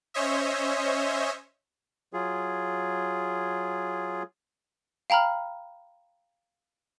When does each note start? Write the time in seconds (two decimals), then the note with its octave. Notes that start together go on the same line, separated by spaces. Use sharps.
0.14 C#4 C5 C#5 D#5 E5
2.13 F#3 F4 G#4
5.10 F5 G5 A#5 B5 F6